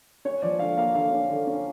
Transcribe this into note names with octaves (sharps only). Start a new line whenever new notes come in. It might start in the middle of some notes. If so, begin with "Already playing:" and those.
C#4 C#5
F3 D5
D3 F5
A#3 F5
D3 F5
C#4
D3
C#4